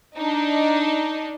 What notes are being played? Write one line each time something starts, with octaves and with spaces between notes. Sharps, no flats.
D4 D#4